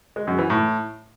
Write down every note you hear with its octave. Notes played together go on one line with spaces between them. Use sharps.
G#3
F#2
E3
A2